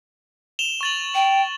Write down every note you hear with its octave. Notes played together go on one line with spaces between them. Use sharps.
E7 F7 G7
C#6 A6 F#7
G5